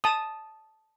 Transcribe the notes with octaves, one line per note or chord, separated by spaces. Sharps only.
A5 D#6